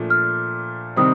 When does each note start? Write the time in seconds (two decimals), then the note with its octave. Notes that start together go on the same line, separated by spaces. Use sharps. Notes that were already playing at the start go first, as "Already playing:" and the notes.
Already playing: A#2 F3 A3 D4
0.10 F6
0.96 C3 D#3 G3 C4 D#6